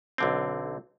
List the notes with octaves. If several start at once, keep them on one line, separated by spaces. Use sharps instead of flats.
B1 D3 C4